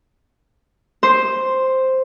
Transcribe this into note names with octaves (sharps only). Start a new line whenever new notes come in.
C5